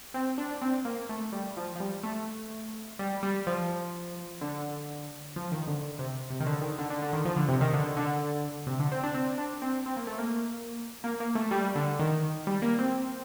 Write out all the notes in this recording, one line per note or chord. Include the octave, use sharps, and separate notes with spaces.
C4
D4
C4
A#3
A3
G3
F3
F3
G3
A3
G3
G3
F3
D3
F3
D#3
D3
C3
C3
D#3
D3
D#3
D3
D3
D3
D#3
F3
D3
C3
D#3
D3
D3
C3
D3
C4
D4
C4
D4
C4
C4
A#3
A3
A#3
A#3
A#3
A3
G3
D3
D#3
G3
A#3
C4